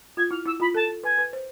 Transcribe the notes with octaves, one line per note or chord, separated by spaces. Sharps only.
F4 G#6
E4 F6
E4 E6
F4 B5
A4 A5
B4 G#5
B4
C5